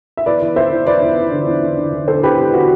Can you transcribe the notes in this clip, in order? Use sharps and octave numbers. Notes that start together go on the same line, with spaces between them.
E5
E2 B4 D5
E2
E2 C5 E5
E2
E2 B4 D5
E2
E2
D3
E2
D3
D3
D3
D3 A4 C5
E2 G4 B4
E2
D3 F#4